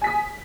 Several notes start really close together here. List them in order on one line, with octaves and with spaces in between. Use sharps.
G#5 B6 D#6